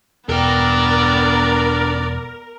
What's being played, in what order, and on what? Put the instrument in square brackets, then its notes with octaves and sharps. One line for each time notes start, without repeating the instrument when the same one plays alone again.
[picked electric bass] E1 [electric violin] B3 D5 [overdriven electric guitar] D4 G5 [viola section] A#4